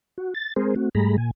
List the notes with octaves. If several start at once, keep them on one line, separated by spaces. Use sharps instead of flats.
F#4
A6
G#3 C4 G#4 A#4 C5
A3 C4 F#4
G#2 G3 A3 G#4 A#5 B5
A#2 G#5